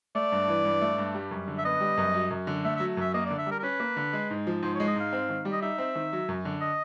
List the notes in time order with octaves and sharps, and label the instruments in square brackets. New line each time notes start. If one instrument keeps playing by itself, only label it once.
[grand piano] A3 [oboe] D5
[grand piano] G2
E3
G2
A3
G2
G3
F#2
D3
[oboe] E5
[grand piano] B3 [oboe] D#5
[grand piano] G3
F#2
F#3
F#2
D3
[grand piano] A3 [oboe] E5
[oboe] E5
[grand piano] F#3
[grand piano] F#2 [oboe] E5
[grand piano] A#3 [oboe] D#5
[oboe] D5
[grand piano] D3
[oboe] E5
[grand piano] G3 [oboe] A#4
[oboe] A#4
[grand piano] C#4 [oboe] B4
[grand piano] A#3
D3
G#3
G#2
F3
[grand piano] G#2 [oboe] C5
[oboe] C#5
[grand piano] G#3
[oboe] D#5
[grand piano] G#2 [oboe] F5
[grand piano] C4
D#3
G3
[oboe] D#5
[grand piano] D#4 [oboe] E5
[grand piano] C4
D#3
F#3
F#2
D3
[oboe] D#5